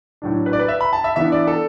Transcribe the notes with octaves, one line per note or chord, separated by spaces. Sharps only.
A2 F#3 D4
B4
D5
B4
E5
B5
A5
E5
E3 B3 D4 E5
D5
A4